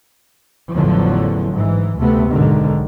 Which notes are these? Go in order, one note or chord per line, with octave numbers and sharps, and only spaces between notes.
A1 E2 D3 F3 F#3
G#2 E3
D2 C3 A3 B3
B1 G#2 D3 D#3